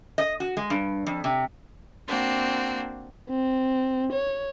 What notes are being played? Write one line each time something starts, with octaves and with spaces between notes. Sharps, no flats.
D#5
F#4
G#3
G2
F2
C3
A#3 C4 D4 F#4
C4
C#5